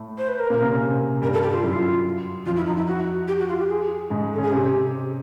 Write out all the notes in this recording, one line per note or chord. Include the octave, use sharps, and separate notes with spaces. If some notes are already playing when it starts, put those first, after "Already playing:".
Already playing: A2 A3
C5
B4
A#4
A#2 A#3
C3 C4
C#3 C#4
C3 C4
G2 G3 A#4
A4
G4
F4
F#2 F#3 E4
F4
F2 F3 F4
E4
D#4
E4
F#4
G4
F#4
F4
G4
G#4
G#2 G#3
A4
C#3 C#4 G#4
C3 C4 G4